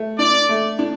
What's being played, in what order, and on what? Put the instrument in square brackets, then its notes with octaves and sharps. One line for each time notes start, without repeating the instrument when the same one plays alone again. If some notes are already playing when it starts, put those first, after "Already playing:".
Already playing: [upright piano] A3
[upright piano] D4 [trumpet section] D5
[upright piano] A3
D4